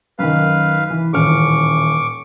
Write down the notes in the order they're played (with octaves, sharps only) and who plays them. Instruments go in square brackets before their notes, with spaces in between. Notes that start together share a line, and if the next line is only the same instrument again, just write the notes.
[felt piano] F#2 D#3 [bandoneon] B4 F5
[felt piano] E3
[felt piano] D#1 A1 F6 [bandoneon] C#6 D6